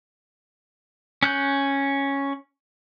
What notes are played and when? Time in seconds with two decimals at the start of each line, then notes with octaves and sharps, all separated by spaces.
1.23 C#4 F#6 G6